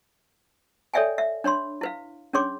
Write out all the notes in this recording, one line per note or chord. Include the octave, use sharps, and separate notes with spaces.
A4 C#5 D5 E5 G5 G#5
E5
D4 C#5 B5 C6
E4 B4 F5
C#4 D4 G#4 C#5 C6 D6